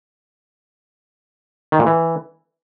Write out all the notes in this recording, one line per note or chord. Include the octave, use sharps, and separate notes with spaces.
D#3
A#2
E3